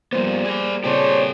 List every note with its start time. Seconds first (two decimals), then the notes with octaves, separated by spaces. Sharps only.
0.13 F3 G3 A#3 B3 C5
0.45 G#4 D5
0.84 A#2 C#3 C4 D4 G4 A4 C5 C#5